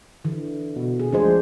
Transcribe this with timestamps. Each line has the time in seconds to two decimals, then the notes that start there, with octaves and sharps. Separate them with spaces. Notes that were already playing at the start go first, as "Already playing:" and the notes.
0.24 D3 E3
0.76 B2
1.00 G#4
1.13 D2 F3 G#3 D4 G#4 C5